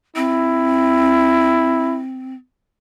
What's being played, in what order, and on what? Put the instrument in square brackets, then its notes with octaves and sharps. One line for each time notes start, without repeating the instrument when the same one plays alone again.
[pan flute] C4 [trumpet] E4